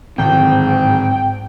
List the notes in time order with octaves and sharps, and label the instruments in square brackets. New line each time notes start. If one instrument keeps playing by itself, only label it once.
[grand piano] D1 G#1 [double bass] G#2 [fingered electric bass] C4 [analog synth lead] G5